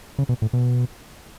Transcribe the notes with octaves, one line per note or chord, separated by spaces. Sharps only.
C#3
B2
A2
B2